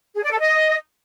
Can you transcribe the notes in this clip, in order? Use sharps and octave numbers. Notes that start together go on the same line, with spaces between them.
G#4
D5
A4
D#5